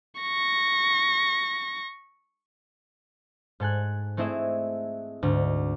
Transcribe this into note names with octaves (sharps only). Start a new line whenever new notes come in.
C#6 A#6
G#2 A4 G#5 F#6
A3 C4 E4 G#4 D#5 E5
D2 G#2